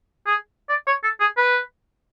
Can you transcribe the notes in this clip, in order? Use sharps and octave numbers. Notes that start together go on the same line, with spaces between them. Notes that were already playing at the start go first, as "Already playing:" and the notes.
G#4
D5
C#5
A4
G#4
B4